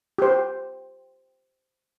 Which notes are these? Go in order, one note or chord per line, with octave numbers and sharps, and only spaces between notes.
G4 C5